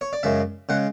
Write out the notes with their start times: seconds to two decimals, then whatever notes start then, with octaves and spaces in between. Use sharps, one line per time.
0.01 C#5
0.13 D5
0.23 F#2 C#3 G#3 E5
0.69 C#3 G#3 F#5